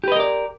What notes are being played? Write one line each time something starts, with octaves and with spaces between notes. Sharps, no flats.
G4 A#4 B4 D5 D#5